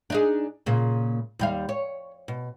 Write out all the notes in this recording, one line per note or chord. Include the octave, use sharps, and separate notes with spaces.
D4 D#4 G#4
A#2 C#3
D#2 G3 F5
C#5
B2